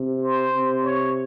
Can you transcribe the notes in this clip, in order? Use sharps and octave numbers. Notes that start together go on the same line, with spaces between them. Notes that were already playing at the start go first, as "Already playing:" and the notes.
Already playing: C3
C5
C3
C#5